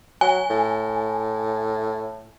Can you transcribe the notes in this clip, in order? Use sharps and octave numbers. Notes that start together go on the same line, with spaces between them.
F#3 G#5
A2